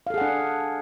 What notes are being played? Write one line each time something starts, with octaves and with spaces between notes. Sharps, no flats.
D4 G#4 A4 F5 F#5